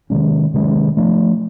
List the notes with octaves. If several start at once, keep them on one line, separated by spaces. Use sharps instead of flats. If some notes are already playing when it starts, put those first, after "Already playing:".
C3 D#3 G#3 C#4
C3 D#3 G#3 C#4
F3 A3 D4